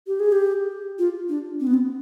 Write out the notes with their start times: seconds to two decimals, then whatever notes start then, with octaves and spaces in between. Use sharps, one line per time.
0.07 G4
0.20 G#4
0.32 G4
0.99 F4
1.29 D4
1.60 C4
1.67 B3
1.74 C4